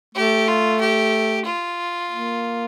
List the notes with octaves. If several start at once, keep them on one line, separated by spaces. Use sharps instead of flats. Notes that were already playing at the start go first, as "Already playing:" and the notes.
A3 G4
F4
G4
F4
A#3